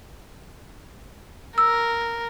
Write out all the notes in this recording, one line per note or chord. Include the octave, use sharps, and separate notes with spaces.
A#4 E6